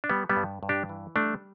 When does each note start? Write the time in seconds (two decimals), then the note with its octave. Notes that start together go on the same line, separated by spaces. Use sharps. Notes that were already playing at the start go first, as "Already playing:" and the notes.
0.04 D4
0.10 G3 B3
0.29 G3 B3
0.36 G2
0.63 G2
0.69 D4 G4
0.89 E3
1.16 G3 A3 D4